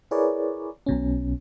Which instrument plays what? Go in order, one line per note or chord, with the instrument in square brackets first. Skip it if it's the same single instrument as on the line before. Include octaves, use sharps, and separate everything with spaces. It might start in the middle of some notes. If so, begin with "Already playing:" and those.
[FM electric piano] E4 G#4 A#4 B4 C#5 D5
B1 B2 C#4